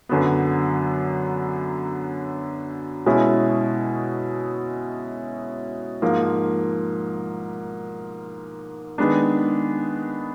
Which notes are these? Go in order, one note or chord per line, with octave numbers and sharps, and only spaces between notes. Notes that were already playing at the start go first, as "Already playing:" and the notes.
F#2 D3 F#3 B3
B2 G#3 C#4 E4
G#2 F3 A#3
D#3 G#3 B3 D4